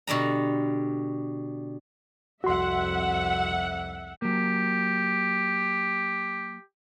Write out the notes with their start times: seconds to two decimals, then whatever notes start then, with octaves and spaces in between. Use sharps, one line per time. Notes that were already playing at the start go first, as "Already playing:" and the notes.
0.07 B2 D3 G3 A#5
2.44 C2 F2 F#4 E5 F#5 C6
4.22 F#3 A#3 G4